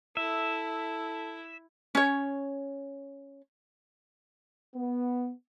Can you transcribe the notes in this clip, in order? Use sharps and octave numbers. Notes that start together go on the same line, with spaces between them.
E4 A4 E5
C#4 C#5
B3